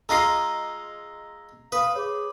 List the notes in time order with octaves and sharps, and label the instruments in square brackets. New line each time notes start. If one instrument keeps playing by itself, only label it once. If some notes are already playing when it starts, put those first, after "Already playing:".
[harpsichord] G#3 F4 D#5 [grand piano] A#5 A#6 C7 [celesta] E6
[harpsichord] B4 [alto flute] F5 [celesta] D#6
[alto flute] G#4 [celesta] C#5 D6